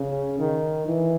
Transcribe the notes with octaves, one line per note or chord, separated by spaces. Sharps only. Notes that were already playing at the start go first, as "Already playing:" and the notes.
Already playing: C#3
D#3
E3